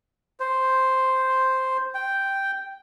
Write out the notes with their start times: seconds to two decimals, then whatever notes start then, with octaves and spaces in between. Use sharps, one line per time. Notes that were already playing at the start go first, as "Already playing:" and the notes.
0.40 C5
1.95 G5